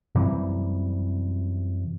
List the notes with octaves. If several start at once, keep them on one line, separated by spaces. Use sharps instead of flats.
F#2 C3 E3 G3